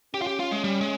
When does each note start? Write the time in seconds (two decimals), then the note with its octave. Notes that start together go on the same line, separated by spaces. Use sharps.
0.14 C#4 G4
0.22 F4
0.27 G4
0.40 F4
0.51 G#3
0.64 G3
0.81 G#3